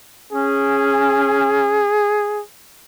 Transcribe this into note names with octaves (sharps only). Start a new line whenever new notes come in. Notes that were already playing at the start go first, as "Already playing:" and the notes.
C#4 G#4